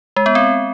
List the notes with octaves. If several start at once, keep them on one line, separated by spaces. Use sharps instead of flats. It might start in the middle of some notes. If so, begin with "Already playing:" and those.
G#3
B3
C4